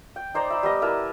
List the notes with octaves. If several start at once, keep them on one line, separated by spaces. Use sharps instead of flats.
G5
D#4 C5 D5 A#5
E5 B5
G3 B3 D#5 B5
E4 A#4 B4 A5